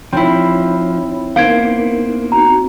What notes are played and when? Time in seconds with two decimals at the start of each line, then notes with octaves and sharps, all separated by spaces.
0.13 F3 C4 D#4 E4 C#5 B5
1.36 A#3 B3 D#4 A#4 C5 F5 G#6 D7
2.32 C4 D#4 F#4 A#5